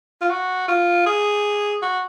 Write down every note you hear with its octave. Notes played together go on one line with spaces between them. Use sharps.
F4
F#4
F4
G#4
F#4